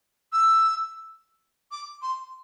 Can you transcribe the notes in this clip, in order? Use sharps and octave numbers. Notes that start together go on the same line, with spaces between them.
E6
D6
C6